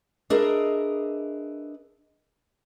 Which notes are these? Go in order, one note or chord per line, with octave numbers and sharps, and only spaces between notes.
D4 G#4 A#4 B4 D#5 E5